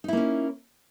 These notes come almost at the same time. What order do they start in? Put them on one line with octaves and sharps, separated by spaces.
D#4 E4 A#3 C#4